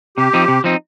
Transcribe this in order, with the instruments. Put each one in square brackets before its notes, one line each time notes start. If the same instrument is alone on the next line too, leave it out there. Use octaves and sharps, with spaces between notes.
[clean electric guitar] C3 [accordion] G4
[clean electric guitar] F3 C4 D#4
C3
F3 C4 D#4